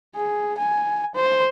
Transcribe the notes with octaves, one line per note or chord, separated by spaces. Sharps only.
G#4
G#5
C5